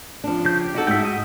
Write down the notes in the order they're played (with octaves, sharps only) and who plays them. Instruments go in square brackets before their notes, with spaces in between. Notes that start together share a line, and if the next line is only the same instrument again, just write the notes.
[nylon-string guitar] F3 D4
[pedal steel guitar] C#3 G6
G4
[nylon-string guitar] D#4 F#4 A4
[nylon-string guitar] G#2 F#4 [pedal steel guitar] E5 G5
[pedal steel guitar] D#5